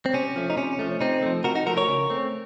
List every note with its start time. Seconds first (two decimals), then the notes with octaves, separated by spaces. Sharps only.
0.06 C4
0.13 C3 C#4
0.36 F3 A3
0.50 D#4
0.57 C3 C#4
0.79 F3 A3
1.00 C3 C4 D#4
1.22 F3 A3
1.44 C3 F#4 A#4
1.55 D#4 F#4
1.66 F3 A3 F#4 A#4
1.77 A#4 C#5
1.88 C#3
2.10 A3 C4